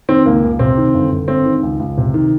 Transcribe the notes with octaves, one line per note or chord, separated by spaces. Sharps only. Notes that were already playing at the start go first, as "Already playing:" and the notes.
D#3 C4
C#2 A#3
C#2
C3 C4
D#3
G1
G1
G2 C4
D#3
C#2
C#2
C3
D#3